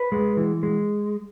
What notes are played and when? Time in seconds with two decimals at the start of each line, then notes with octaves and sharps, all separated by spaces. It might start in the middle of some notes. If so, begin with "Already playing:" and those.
Already playing: B4
0.12 G#3
0.37 E3
0.63 G#3